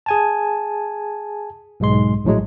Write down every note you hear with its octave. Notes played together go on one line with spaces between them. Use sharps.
G#4 G#5 A5
B1 G#2 G#3 C6
A#1 A2 F#3 G#3